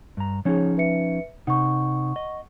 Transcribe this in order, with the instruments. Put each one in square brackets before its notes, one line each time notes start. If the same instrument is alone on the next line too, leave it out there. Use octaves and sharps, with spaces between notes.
[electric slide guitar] G2 A#5
[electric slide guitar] F3 C#4 D#4 [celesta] G#4 C#5
[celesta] B4 E5 C#7
[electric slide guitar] C3 D#4 [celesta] F#5 C#6
[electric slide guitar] D#5